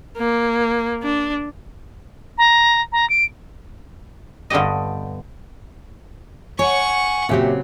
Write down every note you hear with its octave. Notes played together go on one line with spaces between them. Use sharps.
A#3
D4
A#5
A#5
D7
G2 D3 B3 G4 D#5
C#5 F#5 G#5 C#6
A#2 C#3 F#3 C4 G4 E5